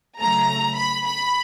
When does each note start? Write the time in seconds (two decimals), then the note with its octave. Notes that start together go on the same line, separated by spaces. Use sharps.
0.19 C#3 F#3 A3 A#5
0.76 B5
1.05 B5